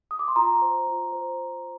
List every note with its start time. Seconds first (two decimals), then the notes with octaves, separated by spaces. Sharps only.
0.11 D#6
0.19 D6
0.28 C6
0.36 F4 A#5
0.62 C5
0.87 F4
1.12 C5